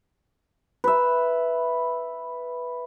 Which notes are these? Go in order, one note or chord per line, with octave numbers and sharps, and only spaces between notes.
B4 E5